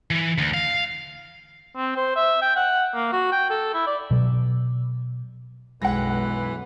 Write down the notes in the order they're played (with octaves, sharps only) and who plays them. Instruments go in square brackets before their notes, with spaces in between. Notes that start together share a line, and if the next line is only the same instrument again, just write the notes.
[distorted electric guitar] E3
D2
F5
[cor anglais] C4
C5
E5
G5
F#5
A#3
F#4
G5
A4
E4
D5
[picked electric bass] B2 F#3
[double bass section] B1 F#2 [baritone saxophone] E3 [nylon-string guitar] G#3 B4 [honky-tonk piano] F#5 A#6